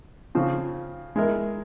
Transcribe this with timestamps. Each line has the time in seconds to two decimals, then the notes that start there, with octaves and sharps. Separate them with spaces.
0.35 C#3 F3 C4
1.16 G#3 E4 A#4